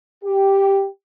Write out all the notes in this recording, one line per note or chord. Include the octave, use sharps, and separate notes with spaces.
G4